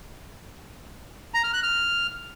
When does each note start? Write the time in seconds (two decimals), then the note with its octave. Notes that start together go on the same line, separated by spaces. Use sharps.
1.34 A#5
1.44 F6
1.53 F#6
1.63 F6